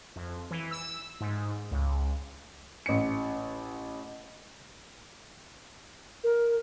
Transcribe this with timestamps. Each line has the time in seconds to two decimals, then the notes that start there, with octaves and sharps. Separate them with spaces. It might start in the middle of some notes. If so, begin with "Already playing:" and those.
0.16 F2
0.51 E3
0.71 E6
1.21 G#2
1.71 C#2
2.86 A1 C#7
6.23 A#4